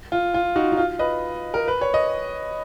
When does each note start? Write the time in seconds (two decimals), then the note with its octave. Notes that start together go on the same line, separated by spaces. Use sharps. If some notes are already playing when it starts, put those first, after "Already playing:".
0.12 F4
0.34 F4
0.56 D#4 F#4
0.72 D#4
0.77 F4
0.99 B4 D#5
1.54 A#4
1.68 B4
1.81 C#5
1.94 D#5